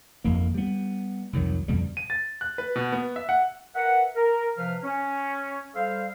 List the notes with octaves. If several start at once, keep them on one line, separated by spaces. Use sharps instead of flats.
G#1 F2 A#3
G3 B3
C2 F2 D#3 F#3
F2 B2 D3 G3
D#7
A6
F#6
B4
B2
B3
E5
F#5
A#4 B4 E5 F#5
A#4
C3 F3 B4 F5 F6
C#4
G3 A4 C5 E5 F5